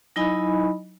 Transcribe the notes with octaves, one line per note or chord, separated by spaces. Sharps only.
F#3 D#4 E4 D#5 G#5 B5